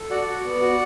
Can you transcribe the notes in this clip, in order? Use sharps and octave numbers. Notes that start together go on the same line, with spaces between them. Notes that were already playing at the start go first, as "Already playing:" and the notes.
Already playing: A4
F#4 D5 F#5
F#4
B3
F#4